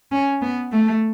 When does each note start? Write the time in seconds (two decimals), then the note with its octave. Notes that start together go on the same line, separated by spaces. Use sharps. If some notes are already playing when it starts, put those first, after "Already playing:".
0.12 C#4
0.42 B3
0.72 A3